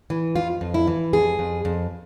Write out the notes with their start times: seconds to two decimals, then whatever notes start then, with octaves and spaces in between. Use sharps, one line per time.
0.10 E3
0.35 F2 F4
0.61 F2
0.74 E4
0.87 E3
1.13 F2 G#4
1.39 F2
1.65 F2